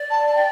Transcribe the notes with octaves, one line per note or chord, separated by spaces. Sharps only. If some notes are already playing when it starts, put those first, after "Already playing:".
Already playing: D5
A5
A5
G5